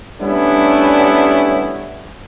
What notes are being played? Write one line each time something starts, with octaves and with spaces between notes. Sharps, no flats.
G3 A3 B3 C#4 D4 E4